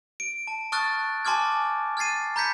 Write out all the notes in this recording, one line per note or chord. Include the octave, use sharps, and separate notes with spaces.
D7
A5
A5 C#6 D#6 F6 F#6 A6
G#5 A5 C6 D6 F6 G#6
F6 G#6 A6 C7 D#7
A#5 B5 G6 G#6 B6 C#7